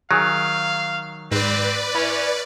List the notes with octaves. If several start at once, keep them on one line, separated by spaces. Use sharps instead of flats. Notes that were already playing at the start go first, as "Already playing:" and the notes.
D#3 F#3 G#4 F5
G#2 C4 B4 D5
C#4 E4